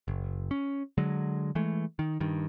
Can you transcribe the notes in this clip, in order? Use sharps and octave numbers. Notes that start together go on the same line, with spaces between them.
F#1
C#4
D3 F#3 G#3
E3 G#3 A3
D#3
G2 D#3